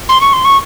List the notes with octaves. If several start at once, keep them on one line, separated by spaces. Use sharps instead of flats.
C6
C#6
C6
C#6